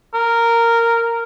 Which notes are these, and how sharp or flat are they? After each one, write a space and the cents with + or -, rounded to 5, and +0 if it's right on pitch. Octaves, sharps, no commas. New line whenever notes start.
A#4 -10